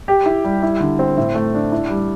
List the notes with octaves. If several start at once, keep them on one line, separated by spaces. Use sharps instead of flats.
G4
E4
G3
E4
D3
C4
A2
A3
D4
E4
G3